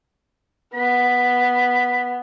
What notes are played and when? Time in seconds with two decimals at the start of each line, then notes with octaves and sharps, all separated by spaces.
0.74 B3 B5